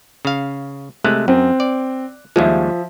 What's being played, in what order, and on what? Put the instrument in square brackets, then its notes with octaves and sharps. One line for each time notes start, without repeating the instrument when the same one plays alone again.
[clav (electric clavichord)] C#3 F5
[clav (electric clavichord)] C3 G#3 A3 [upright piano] F#6
[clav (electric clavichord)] F#2 [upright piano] C4
[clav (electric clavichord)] D5
[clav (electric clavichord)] D#2 G3 G#3 [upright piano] F3 E5